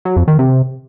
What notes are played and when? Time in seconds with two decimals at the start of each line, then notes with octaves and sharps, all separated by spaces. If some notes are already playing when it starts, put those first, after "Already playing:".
0.05 F#3
0.16 F2
0.28 D#3
0.39 C3